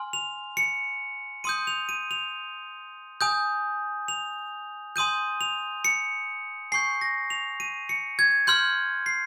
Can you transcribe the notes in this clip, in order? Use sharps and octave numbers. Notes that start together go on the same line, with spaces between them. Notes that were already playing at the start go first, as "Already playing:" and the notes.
Already playing: G#5 C6 F6
F7
C#7
C6 D#6 G6 D#7
F7
D#7
F7
G#5 D#6 G6
F7
G#5 C6 D#6 G6 D#7
F7
C#7
G#5 C#6 G6 C7
A#6
F7
D#7
C#7
G#6
C6 F6 G6
C7